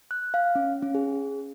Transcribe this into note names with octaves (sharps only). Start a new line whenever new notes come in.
F#6
F5
C#4
C#4
G#4